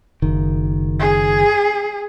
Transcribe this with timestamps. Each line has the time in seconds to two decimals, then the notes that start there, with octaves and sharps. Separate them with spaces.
0.22 F#1 D#3
0.99 G#4